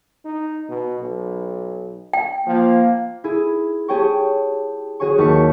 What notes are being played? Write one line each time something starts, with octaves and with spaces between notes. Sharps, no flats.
D#4
B2
B1
G5
F3 A#3
E4 G#4
G4 G#4 C#5 G5 A5 C#6
F#4 G#4 C#5 G#5 C#6
D#2 A5 C#6 B6 C#7